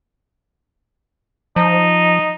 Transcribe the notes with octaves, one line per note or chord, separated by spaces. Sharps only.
F3 D#4